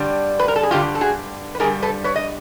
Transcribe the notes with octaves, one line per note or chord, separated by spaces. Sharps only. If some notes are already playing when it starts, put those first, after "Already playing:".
Already playing: G2 D3 G3
B4
A#4
A4
G#4
G2 D3 G3 F4 G4
A4
F#4 G#4
B4
G2 D3 G3 G#4 A#4
A4 B4
B4 C#5
D#5